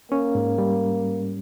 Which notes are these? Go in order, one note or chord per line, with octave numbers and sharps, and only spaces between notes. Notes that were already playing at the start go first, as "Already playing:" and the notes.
A#3 C#4
G#2
G3